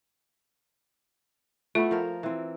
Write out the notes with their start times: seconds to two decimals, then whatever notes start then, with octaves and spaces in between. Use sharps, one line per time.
1.75 A3 B3 E4 F4
1.91 F3 A#4
2.23 E3 C4